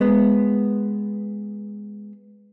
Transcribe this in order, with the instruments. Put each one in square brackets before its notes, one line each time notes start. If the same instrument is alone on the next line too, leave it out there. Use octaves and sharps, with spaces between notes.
[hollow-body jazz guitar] G#3 B3